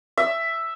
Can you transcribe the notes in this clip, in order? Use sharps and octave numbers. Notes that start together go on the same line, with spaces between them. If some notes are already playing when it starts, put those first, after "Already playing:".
E5